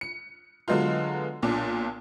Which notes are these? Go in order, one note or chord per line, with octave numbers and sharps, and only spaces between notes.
C#7
D3 F#3 G#3 B3 F4
B1 A#2 D4